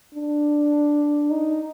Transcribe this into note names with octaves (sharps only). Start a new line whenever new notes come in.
D4
D#4